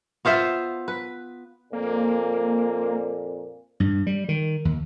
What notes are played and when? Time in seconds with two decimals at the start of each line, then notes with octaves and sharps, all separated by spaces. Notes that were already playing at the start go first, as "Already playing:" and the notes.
0.25 B3 F4 C5 E5
0.88 B4
1.73 F2 A#2 A#3
3.80 G2
4.07 G3
4.29 D#3
4.65 D#2